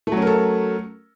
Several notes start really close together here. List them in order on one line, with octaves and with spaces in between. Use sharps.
A3 F#3 C#4 A#4 A4